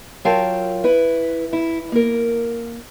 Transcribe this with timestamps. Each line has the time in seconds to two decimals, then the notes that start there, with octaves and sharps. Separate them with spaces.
0.25 F#3 F4 A#4 F5 G5 A5
0.84 E4 B4
1.53 E4
1.92 A#3 A#4